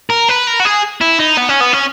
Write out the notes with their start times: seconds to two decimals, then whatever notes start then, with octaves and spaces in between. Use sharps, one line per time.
0.10 A#4
0.29 B4
0.47 A#4
0.60 F#4
0.65 G#4
1.01 E4
1.19 D#4
1.37 B3
1.49 C#4
1.61 B3
1.73 C#4